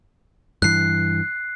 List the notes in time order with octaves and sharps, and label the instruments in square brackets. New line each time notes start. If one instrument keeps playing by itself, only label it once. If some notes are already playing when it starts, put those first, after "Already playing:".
[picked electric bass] G2 E3 [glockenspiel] F#6 C7